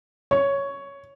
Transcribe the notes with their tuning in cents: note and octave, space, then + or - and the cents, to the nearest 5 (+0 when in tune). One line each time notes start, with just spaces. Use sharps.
C#5 +5